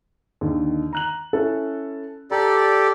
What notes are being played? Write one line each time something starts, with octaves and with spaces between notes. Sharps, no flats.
D#2 D3 D#3
A#5 F#6 F#7
C#4 E4 A4
G4 A4 D5 A#5